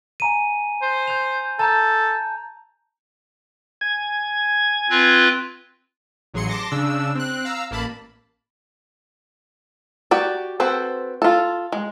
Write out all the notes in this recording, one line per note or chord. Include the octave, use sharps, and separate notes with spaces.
G#5 A#5 D#7
C5
G6 F7
A4 A5 A#5 G6
G#5 G#6
C4 F4 B4
A1 F#3 G#4 C6 C#7
A5 C6 D6 A#6
C#3 D4 E6
C4 F#6
F5 A#5 E6
A1 A#3 A5 B5
F#4 G4 D5
C4 F#4 A4 B4 C5
F4 A4
G#3